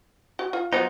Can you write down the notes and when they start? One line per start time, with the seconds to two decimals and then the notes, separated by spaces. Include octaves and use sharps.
0.39 F#4
0.53 F4
0.73 F#3 B3 D#4 F4 F#4 C5